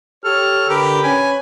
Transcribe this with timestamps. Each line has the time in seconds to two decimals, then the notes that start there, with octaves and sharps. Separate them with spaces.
0.25 G4 A4 C#5 F6
0.69 D3 G4 A#4 B4
1.03 C#4 B4 G#5